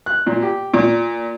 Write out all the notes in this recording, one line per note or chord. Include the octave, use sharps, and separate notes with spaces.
F#6
A#2
G4
A#2